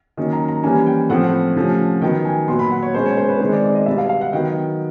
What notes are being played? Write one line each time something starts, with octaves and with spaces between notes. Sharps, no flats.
D#3 F#3 A#3 C#4
A#5
A#5
E3 G3 A#3 C#4 G#5
G5
A2 F3 A3 C4 F#5
C3 F3 A3 C#4
D#3 F#3 B3 G5
G#5
A#2 F#3 B3 C6
B5
F#5
C#5
B2 G#3 C#4 C5
C#5
C5
B4
D#3 G#3 C4 C5
D5
D5
D#5
B2 G3 B3 E5
F5
F5
F#5
D#3 F#3 B3 G5